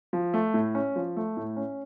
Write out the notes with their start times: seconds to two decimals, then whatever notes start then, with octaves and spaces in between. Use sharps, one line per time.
0.13 F3
0.34 A3
0.54 A2
0.75 C#4
0.96 F3
1.17 A3
1.37 A2
1.57 C#4